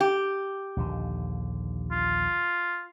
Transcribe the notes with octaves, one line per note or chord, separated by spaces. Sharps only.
G4
A#1 D#2 D3
F4